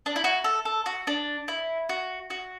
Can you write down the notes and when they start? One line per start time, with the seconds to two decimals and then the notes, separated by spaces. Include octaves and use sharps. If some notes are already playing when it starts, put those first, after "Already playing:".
0.06 D4
0.16 E4
0.24 F#4
0.44 A4
0.65 A4
0.86 F#4
1.07 D4
1.48 E4
1.89 F#4
2.30 F#4